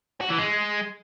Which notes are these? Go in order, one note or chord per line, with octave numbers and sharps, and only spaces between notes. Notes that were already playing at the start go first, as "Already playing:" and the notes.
F#4
E3
G#3